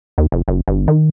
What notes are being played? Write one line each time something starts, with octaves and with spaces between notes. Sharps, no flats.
D#2
F1
F#1
G1
D#3